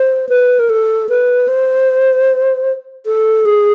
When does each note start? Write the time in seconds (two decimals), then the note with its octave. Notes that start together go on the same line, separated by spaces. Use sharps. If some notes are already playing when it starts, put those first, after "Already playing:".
Already playing: C5
0.29 B4
0.59 A#4
0.70 A4
1.09 B4
1.48 C5
3.06 A4
3.45 G#4